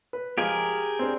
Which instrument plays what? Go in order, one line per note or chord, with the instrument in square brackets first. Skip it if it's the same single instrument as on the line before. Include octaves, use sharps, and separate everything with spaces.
[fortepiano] B4
[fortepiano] F3 G#3 F5 [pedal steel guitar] G4 G#4 A#4
[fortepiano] C4 D4